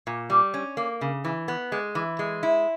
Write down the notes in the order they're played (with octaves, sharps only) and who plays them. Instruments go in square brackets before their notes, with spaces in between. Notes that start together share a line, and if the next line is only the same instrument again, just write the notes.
[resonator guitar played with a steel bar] A#2
G3
C#4
A#3
C#3
E3
B3
G#3
E3
G#3
E4